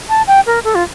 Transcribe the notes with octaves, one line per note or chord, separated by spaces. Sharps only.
A5
G5
A#4
A4
F4